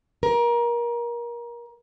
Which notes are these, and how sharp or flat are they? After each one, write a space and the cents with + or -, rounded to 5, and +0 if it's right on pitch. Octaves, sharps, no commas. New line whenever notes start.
A#4 +25